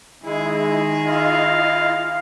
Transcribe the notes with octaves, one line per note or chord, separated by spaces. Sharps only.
D#3 G#3 E4 G#4
E4 F4 D#5 F5